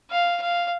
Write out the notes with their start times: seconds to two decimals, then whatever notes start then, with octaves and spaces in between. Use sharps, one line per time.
0.11 F5
0.42 F5